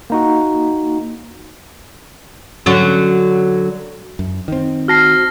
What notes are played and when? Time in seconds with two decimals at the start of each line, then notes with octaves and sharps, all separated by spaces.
0.10 A#3 D#4 F#4
2.66 D3 F#3 C#4
4.19 F#2
4.48 D#3 C4
4.88 F#4 A5 F6 A#6 C7